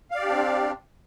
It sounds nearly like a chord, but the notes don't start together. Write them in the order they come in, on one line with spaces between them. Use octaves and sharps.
F5 D5 G4 D4 C4